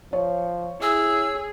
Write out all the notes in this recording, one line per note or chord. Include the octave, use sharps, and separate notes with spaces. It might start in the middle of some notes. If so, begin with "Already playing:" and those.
F3 C#5
E4 G#4 E6